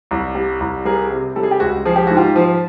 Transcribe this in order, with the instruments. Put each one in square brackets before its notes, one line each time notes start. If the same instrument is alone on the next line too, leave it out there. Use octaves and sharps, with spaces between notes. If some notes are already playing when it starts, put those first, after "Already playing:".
[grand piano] C2
G3
C2
G3 G#4 A#4
C3
G3 A4
G#4
G4
C#2 F#4 G#4
F3 G#4
G4
G#2 F#4
F4 G4
F3